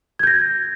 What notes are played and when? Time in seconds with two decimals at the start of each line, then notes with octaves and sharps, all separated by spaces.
0.19 G#6
0.23 G6
0.27 A#6